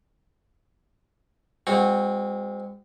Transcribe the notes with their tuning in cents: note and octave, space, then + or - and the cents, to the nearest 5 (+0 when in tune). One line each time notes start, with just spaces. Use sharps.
G#3 -35 C4 -15 F#4 -15